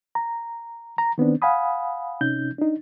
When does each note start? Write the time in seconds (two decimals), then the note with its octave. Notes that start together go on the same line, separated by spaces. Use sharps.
0.15 A#5
0.98 A#5
1.18 D#3 B3 C4 D4
1.42 F5 F#5 G#5 B5 D#6
2.21 C3 C#4 D#4 G6
2.58 D4 D#4